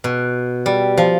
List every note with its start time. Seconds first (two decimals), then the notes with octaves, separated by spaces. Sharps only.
0.04 B2
0.66 G3
0.97 F3